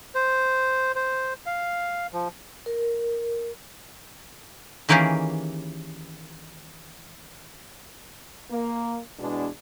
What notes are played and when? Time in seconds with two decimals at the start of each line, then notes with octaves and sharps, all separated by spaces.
0.15 C5
0.95 C5
1.46 F5
2.13 F3
2.66 A#4
4.89 D#3 E3 A#3 C#4 G4 G#4
8.50 A#3
9.19 E2 B2 G#3 D4